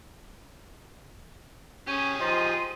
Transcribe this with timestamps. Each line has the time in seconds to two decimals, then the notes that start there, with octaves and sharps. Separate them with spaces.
1.87 C#4 G4 G#4 D#7
2.20 F3 D#4 D#5 C6